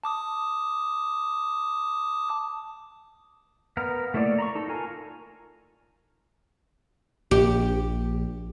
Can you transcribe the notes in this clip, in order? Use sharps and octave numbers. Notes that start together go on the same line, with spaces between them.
A5 D6 D#6
B3 A#4 F5
A3 A#3 E4 C#5 D5
A#5 B5 C#6
D#4 A4
F4 A#4 G#5 A#5
A#1 G4